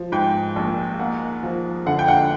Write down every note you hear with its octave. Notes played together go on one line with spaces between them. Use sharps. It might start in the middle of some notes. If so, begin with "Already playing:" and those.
Already playing: F3
G#2 G5
A#1
A#3 F#5
F3
D3 F#5
G5
F#5